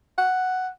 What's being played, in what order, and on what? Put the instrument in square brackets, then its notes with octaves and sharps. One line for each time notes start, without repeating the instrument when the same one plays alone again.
[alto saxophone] F#5